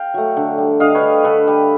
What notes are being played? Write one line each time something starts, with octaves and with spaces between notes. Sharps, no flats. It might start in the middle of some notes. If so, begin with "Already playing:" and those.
Already playing: F5 G5
F#3 A3
D3
G3
D3 D#5 F5
B4 C#5
G3
D3 A4 B4
G3